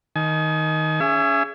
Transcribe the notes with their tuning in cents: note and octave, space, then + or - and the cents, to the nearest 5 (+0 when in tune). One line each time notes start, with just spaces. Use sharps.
D#3 +10 G#5 +40
C#4 +25 G#4 +0 E5 +35